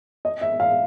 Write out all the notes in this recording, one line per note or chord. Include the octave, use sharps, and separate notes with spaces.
D#5
E5
F5